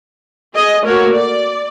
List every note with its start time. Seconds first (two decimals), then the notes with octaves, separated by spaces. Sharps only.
0.53 G#4 D#5
0.83 A3 A#3 F#4 A#4 C#5
1.14 D5